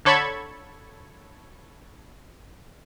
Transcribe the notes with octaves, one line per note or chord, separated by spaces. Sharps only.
D3 A4 C#5 B5 C#6 G#6